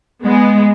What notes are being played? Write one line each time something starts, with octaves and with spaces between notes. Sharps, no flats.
G#3 B3